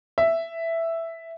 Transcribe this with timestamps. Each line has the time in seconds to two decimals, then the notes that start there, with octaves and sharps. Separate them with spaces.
0.18 E5